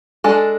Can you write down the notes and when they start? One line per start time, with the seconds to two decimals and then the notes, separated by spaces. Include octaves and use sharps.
0.24 G#3 D4 A4